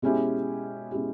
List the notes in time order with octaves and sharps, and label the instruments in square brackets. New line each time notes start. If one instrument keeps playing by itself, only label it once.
[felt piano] B2 G#3 C#4 E4 G4
B2 G#3 C#4 E4 G4